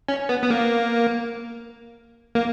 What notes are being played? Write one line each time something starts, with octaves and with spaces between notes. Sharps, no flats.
C#4
B3
B3
A#3
A#3